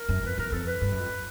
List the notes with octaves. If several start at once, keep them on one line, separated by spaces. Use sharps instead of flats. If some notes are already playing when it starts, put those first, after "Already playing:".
Already playing: A#4
F#2
F2 B4
E2 A#4
F2 A4
B4
G2
F#2
F2